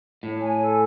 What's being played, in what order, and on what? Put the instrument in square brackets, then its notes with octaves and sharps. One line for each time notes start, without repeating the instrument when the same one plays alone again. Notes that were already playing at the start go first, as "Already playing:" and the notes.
[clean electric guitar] A2 [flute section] C#5
[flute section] G#5
A4